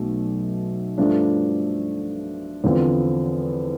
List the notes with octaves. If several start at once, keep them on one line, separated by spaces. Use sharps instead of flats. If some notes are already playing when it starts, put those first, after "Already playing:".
Already playing: B1 B2 A3
G2 F3 A3 D4
E2 D3 F3 C4